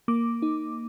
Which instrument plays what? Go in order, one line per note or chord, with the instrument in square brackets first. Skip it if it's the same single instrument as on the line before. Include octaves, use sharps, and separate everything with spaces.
[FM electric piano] A#3 D6
D#4